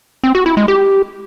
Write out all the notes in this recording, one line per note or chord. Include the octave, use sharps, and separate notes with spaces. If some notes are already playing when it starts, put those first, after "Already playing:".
C4
F#4
E4
G#3
G4